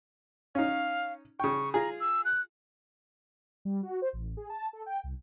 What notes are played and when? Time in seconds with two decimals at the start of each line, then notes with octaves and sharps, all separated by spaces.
0.55 C#4 D#4 F5
1.40 C#3 G5 C#6
1.74 F4 G#4 A#5
2.00 E6
2.25 F#6
3.65 G3
3.83 F#4
4.02 C5
4.13 A1
4.37 G#4
4.49 A5
4.73 A4
4.86 G5
5.04 C2